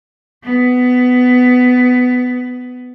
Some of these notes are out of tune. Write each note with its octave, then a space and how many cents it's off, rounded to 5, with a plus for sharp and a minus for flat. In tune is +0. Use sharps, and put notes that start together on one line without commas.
B3 +15